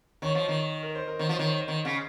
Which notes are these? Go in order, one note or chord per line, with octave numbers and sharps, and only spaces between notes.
D#3 C#5
F3
D#3
A#4
C5
A#4
D#3 C5
F3 C#5
D#3
C5
C5
D#3
C#3